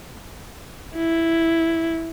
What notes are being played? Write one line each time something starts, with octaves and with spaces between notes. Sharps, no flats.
E4